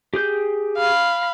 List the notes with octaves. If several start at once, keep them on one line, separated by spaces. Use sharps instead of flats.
G4 G#4 G6
F5 B5